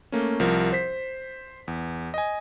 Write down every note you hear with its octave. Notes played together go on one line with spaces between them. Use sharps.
A3 A#3 C#4
C2 F3 A#4
C5 B6
E2
D#5 G#5